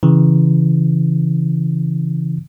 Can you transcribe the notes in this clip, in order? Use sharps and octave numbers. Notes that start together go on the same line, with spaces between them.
C#3 E3